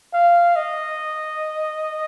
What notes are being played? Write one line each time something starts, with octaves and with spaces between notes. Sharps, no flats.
F5
D#5